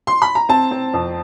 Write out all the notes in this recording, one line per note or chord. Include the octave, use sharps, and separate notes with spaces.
C6
B5
A#5
C4 A5
C4
F2